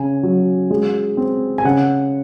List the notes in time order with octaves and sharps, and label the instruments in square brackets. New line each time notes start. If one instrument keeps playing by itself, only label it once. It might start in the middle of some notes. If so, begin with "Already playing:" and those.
Already playing: [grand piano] C#3 G#5
F#3
G#3
C4
G#5
C#3 F#5